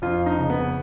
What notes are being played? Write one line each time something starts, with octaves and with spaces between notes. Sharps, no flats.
F2 F4
D#4
C#3
B3